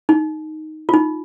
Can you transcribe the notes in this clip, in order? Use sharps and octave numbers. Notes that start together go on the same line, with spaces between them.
D#4
F4
D#4